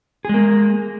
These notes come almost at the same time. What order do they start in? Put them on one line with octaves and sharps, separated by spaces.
G#4 G#3 A#3